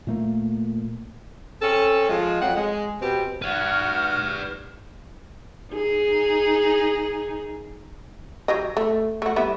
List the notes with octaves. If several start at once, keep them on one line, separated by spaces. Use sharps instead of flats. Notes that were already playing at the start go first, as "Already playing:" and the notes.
A#2 A3 A#3
C4 C#4 A4
F3 G#3
F2 F#3 F#5
G#3
B2 C4 G4
F#4 B4 D5 F6
D#4 G#4
F#3 G4 D#5
A3
A3 F#4
G3 B3 E4